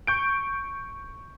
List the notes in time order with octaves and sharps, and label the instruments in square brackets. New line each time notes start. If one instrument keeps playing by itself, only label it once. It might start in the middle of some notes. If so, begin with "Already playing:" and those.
[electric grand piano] C#6 G6 D7